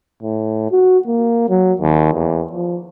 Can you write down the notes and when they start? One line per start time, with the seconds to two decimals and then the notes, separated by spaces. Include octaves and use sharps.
0.23 A2
0.72 F#4
1.07 A#3
1.49 F#3
1.81 D#2
2.13 E2
2.53 F3